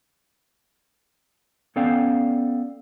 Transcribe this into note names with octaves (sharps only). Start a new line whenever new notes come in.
B3 C#4 A4 D5 F5 G5